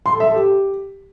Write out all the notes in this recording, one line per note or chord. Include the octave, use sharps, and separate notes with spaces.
C6
A4
E5
A4
G4